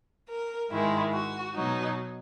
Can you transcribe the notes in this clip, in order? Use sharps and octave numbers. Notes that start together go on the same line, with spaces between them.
A#4
G#2 D#3 G#3 E4
F#4
B2 F#3 D#4